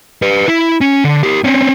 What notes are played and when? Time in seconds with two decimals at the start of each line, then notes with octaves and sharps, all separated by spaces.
0.22 G4 B4
0.48 E4
0.81 C#4
1.04 D3
1.23 G4 A#4
1.44 C4 C#4